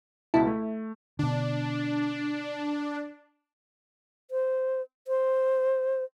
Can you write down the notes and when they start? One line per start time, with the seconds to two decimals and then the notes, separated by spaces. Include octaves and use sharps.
0.34 C#2 B2 E4 A5
0.47 A3
1.19 B2 D3 D4
4.31 C5
5.08 C5